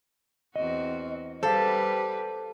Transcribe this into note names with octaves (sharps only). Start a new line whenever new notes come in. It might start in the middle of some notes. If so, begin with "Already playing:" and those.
E2 C4 F#4 D#5
G3 G4 A4 B4 C5 F5